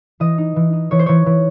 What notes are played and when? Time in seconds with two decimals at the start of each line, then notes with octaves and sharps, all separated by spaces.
0.20 E3 D#5
0.38 D#4
0.56 E3
0.73 D#4
0.91 E3 C#5
0.99 C5
1.06 E3 C#5
1.26 E3